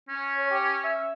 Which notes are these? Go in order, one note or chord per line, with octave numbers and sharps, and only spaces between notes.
C#4
C#5
G4
E5